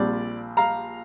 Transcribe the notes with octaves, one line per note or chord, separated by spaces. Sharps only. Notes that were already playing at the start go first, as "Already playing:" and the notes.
Already playing: A#1 A#2 G3 C4 D5
F5 A#5